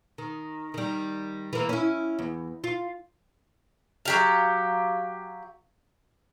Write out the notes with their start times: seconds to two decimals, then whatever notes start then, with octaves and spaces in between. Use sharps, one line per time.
0.18 D#3
0.74 D#3 G3
1.53 E3 A#3
1.69 C#4 E4
2.19 E2
2.64 F4
4.05 F#3 G4 F5